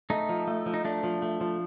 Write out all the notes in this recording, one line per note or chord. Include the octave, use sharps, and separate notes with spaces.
A3 D#4
F3
A3
F3
D#4
A3 D4
F3
A3
F3